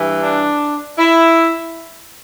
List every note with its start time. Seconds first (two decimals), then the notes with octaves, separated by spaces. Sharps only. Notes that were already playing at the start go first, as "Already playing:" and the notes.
Already playing: G2 E3
0.21 D4
0.98 E4